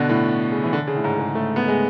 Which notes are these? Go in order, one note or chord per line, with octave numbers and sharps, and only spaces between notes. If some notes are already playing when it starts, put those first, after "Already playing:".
Already playing: B2 D3
A2
C#3
E3
D3
C#3
A2
G#2
C#3
A3
B3
G#3